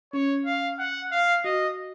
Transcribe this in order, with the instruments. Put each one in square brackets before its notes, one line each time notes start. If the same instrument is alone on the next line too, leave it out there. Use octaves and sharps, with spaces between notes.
[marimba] C#4 [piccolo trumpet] C#5
[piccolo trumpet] F5
F#5
F5
[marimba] F#4 [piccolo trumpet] D#5